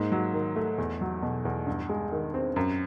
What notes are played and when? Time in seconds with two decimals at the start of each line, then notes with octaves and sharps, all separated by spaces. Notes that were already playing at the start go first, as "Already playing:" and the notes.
Already playing: G#2 A#3
0.12 F#3
0.34 D#3
0.56 A3
0.78 E2
1.01 F#3
1.22 B2
1.45 E2
1.67 G2
1.89 G#3
2.12 D#3
2.34 C4
2.56 F#2